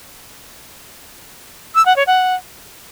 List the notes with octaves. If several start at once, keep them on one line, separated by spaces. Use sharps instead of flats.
E6
F#5
C#5
F#5